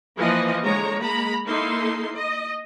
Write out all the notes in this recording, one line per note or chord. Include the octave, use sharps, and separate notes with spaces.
E3 F3 A#3 B4 D#5
D3 G#3 C#5 A#5
G#3 A#3 A#5 B5
A#3 D#4 E4 A4 C6
D#5